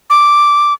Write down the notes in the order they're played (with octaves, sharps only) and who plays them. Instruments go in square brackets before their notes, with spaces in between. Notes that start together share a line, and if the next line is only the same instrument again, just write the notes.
[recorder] D6